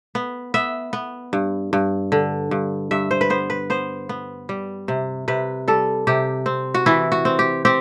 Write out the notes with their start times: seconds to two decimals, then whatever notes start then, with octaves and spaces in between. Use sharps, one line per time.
0.15 B3
0.54 B3 E5
0.93 B3
1.33 G2
1.73 G2
2.12 D3
2.51 G2
2.91 G2 E5
3.11 C5
3.21 B4
3.30 B3 C5
3.50 B4
3.70 B3 C5
4.09 B3
4.49 G3
4.88 C3
5.28 C3 B4
5.68 G3 A4
6.07 C3 G4
6.46 C4
6.74 F#4
6.86 E3 E4
7.12 F#4
7.25 C4
7.39 G4
7.65 C4 G4